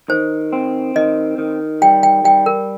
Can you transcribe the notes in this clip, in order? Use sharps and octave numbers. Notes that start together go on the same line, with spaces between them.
D#3 C5
C4
D#3 D#5
D#3
G3 G5
G5
G3 G5
A#4